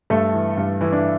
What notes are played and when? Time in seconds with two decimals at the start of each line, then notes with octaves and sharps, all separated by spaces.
0.10 G2 A3 A4
0.34 E3
0.57 G2
0.81 E3 E4
0.92 D4